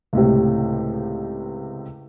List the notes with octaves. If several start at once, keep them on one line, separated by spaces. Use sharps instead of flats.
C#2 A2 C3